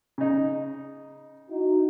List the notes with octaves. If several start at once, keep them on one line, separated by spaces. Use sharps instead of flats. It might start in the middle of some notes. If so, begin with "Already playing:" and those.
C#3 D#4
D#4 E4 F#4